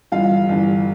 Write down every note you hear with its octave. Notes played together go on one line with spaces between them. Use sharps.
G1 G2 E3 F4 F5
G1 G2 E3